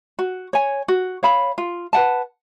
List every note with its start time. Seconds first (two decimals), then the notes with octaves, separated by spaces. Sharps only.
0.19 F#4
0.53 C#5 G#5
0.88 F#4
1.23 C#5 F5 B5
1.58 F4
1.93 B4 F#5 A5